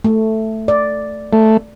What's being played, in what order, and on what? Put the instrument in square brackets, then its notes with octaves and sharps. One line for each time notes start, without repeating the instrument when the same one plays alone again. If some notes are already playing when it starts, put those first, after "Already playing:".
[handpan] A3
D5
[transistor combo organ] A3